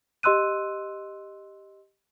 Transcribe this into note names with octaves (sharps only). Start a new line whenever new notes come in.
G4 D#5 C6 E6 F#6 D#7